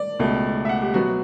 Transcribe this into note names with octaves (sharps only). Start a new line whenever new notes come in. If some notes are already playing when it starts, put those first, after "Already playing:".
Already playing: D5
C#2 B2 A3
E5
F#5
G4
B2 F#3 B3 F#4